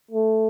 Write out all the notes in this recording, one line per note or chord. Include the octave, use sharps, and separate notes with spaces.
A3